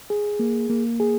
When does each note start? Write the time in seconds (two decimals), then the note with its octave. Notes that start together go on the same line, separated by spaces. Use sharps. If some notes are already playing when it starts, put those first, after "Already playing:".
0.10 G#4
0.39 A#3
0.70 A#3
1.00 G#4